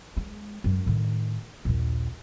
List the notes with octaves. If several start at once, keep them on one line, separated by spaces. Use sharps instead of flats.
G#3
F#2 G#3
A2 D#3
A#1 D#2